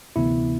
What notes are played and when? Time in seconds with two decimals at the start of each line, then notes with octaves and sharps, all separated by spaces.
0.16 D2 C3 E3 B3 E4